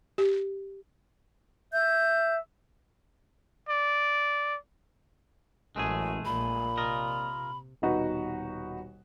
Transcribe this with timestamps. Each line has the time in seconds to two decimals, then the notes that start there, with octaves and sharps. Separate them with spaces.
0.18 G4
1.73 E5 G6
3.69 D5
5.76 A1 F#2 G#3 A3 G#4
6.25 A#1 A#2 B5
6.78 C3 F4 A#4 D#5
7.82 D#1 B2 D#4 F#4 B4